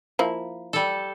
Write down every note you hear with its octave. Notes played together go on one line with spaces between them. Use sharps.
F3 A#3 E4
G3 A4